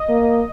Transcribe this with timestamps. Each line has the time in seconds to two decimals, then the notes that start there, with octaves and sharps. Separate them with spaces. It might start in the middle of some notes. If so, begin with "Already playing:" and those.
Already playing: D#5
0.09 A#3